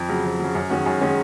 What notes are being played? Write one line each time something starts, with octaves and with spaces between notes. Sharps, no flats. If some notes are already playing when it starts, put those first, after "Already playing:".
Already playing: F2
C#3 F#3
F2
C#3 F#3
F#2
D#3 G#3 C#4 F#4
F#2
D#3 G#3 C#4 F#4